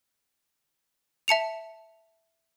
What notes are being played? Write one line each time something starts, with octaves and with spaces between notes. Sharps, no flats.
E5 A5 C#7 F7